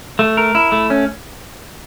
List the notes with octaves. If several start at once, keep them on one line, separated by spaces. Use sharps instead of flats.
A3
A#4
E4
A3
C#4